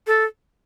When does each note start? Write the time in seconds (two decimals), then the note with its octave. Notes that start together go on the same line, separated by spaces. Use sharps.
0.07 A4